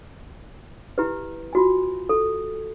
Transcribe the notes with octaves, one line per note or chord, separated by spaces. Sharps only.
E4 G4 B4
F4 F#4 G#5
A4